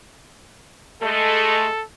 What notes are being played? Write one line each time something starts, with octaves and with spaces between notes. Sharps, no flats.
G#3 A3 A4